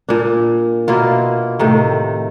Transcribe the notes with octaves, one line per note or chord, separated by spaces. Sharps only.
A#2 D4
B2 A#3 E4 F4
A2 C3 D#3